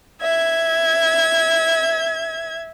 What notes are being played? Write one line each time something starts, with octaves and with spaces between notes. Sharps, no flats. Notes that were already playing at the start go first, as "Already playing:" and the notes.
E5 G#6